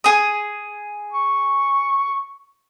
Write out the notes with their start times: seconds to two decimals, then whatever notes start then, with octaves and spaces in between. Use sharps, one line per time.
0.04 G#4 D#6
1.13 C#6